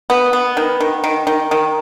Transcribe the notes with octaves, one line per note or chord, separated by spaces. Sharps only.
B3
B3
D#3
D#3
D#3
D#3
D#3